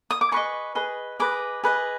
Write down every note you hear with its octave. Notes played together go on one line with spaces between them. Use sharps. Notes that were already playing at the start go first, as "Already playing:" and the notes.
D#6
D6
G#4 B4 D#5 C#6
G#4 B4 D#5
G#4 B4 D#5 D6
G#4 B4 D#5